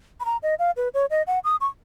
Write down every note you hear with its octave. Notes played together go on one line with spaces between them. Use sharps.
B5
A#5
D#5
F5
B4
C#5
D#5
F#5
D#6
C#6